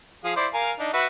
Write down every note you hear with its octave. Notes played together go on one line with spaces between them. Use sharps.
F3 G#4 F5
E4 C5 D5
A#4 F5 G#5
D4 D#4
F#4 B4 E5